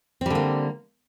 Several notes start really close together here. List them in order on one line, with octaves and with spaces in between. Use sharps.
C4 G3 D3 A#3